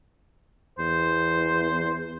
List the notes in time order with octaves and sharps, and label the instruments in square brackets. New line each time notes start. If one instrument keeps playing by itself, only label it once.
[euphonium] E2 [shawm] C5